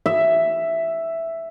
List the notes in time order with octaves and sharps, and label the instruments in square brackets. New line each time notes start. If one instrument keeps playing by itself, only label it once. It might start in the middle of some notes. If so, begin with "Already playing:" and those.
[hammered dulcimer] E5